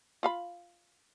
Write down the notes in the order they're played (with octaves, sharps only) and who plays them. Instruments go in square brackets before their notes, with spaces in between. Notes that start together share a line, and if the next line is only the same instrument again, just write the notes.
[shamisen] F4 F5 B5